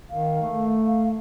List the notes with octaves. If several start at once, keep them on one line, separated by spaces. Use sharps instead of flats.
D#3 F5
A3
F5